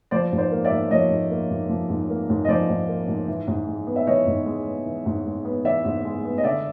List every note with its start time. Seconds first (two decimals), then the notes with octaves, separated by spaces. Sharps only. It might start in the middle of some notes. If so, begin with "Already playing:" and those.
0.11 F3 C5 D5
0.32 G#2
0.38 C5 D5
0.52 A#3
0.65 D5 E5
0.71 G#2
0.91 F3 C#5 D#5
1.10 G#2
1.31 A#3
1.50 G#2
1.69 F3
1.90 G#2
2.10 A#3
2.30 G#2
2.45 D#5
2.48 F3 C5 D5
2.69 G#2
2.88 A#3
3.08 G#2
3.28 E3
3.48 G#2
3.68 G#3
3.87 B3
3.96 E5
4.07 E3 C#5 D#5
4.27 G#2
4.46 G#3
4.67 B3
4.86 E3
5.06 G#2
5.26 G#3
5.45 B3
5.65 E3 D5 E5
5.85 G#2
6.05 G#3
6.25 B3
6.38 D#5
6.44 D3 D5 E5